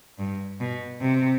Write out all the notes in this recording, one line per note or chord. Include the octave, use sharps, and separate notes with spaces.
G2
B2
C3